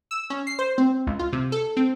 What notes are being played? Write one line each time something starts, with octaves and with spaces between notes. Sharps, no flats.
E6
C#4
C7
C5
C4
C#2
F4
C3
A4
C4